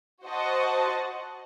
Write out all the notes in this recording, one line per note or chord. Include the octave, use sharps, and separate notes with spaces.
F#4 C5 D#5 F#5 A5